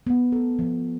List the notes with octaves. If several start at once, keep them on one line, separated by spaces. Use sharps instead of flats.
B3
A4
F3